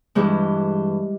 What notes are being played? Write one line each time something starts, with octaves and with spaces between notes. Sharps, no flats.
G2 E3 G#3